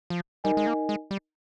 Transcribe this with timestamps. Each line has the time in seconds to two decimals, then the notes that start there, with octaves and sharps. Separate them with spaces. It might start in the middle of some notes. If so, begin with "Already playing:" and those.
0.10 F3
0.44 G3 D#4 A#4 D#5 G#5
0.57 G#3
0.67 A#3
0.89 G#3
1.11 G3